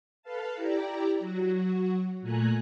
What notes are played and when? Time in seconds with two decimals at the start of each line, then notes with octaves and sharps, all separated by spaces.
0.23 A4 B4 F5 A5
0.56 E4 G4 D5 A#5
1.19 F#3 F#4
2.22 A#2 A3 G#5 A#5 F#6